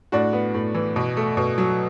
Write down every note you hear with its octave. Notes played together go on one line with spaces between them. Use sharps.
A2 D4 F#4
B3
A2
E3
B2
A3
B2
F#3